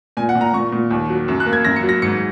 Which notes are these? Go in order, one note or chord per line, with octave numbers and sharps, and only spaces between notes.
A#2 G#5
F#5
A#2
A#5
A#2 C#6
A#2
D#2
F#3
F#2
F#6
A#3
G#6
F#2 A#6
C#7
F#3
A#6
G#2 C#7